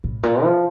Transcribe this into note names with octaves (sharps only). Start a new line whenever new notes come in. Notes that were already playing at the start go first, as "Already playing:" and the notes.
A2
A#2
F3